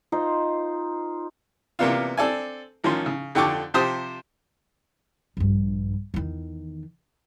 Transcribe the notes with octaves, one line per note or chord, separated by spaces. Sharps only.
D#4 F4 C5
C3 E3 A#3 B3 D4 F4
C4 D4 A4 D5 G#5
A1 D#3 F3 C#4 C6
C#3
F2 D3 G4 G5 C#6 D6
C3 F3 G4 C5 A5 D#6
A#1 G2
E2 D#3